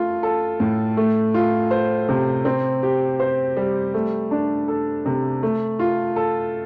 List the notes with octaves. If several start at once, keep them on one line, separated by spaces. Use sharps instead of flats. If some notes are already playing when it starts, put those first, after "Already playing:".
Already playing: A3 F4
A4
A2
A3
F4
C5
C3
C4
G4
C5
G3
A3
D4
A4
C3
A3
F4
A4